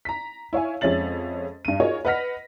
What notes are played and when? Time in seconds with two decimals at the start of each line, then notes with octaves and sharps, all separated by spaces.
0.05 A#5 B6
0.53 E4 C#5 F5 G#5
0.81 F2 G#3 C#4 E5 A6 F#7
1.65 G2 D#7
1.80 F4 F#4 G#4 A#4 C#5 D#5
2.05 B4 D#5 F#5 F6 A#6 B6